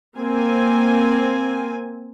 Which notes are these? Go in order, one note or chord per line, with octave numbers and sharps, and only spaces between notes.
A#3 C4 G#5